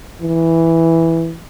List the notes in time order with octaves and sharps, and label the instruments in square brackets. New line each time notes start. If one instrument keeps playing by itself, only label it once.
[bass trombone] E3